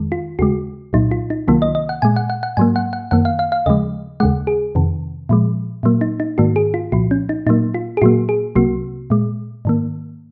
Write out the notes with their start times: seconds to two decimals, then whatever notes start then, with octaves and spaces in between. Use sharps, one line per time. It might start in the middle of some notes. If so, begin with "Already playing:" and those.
Already playing: F2 D#3 G#3
0.12 F4
0.39 D#2 C#3 G#3 F#4
0.93 C2 A#2 F#3 D#4
1.11 F4
1.30 D#4
1.48 C2 C3 D#3 F#3 A#3 F4
1.62 D#5
1.75 D#5
1.89 F#5
2.02 A#2 G#3 G#5
2.16 F#5
2.30 F#5
2.43 F#5
2.57 G#2 F#3 A#3 G#5
2.76 F#5
2.93 F#5
3.11 F#2 D#3 A#3 F#5
3.25 F5
3.39 F5
3.52 F5
3.66 D#2 C#3 F3 G#3 D#5
4.20 D#2 C#3 G#3 F#5
4.47 G#4
4.75 F2 C3 D#3
5.29 A#2 F3 G#3
5.83 A#2 F#3 A#3
6.01 D#4
6.20 D#4
6.38 G#2 D#3 A#3 F#4
6.56 G#4
6.74 F4
6.92 C2 A#2 F3 F#4
7.11 C#4
7.29 D#4
7.47 A#2 F#3 A#3 D#4
7.74 F4
7.97 G#4
8.02 A#2 F#3 A#3 F#4
8.29 G#4
8.55 C2 C3 F#3 A#3 F#4
9.10 A#2 G#3
9.65 G#2 D#3 A#3